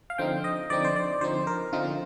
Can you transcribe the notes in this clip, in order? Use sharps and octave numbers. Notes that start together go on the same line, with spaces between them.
F5
D3 F3 C4 D#4 G5
D#5
D3 F3 C4 D#4 D5
C5
D5
D3 F3 C4 D#4 C5
A#4
D3 F3 C4 D#4 F4